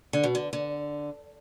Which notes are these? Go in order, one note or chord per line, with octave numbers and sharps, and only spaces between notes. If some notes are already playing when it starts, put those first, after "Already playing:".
D3
B2
D3
D3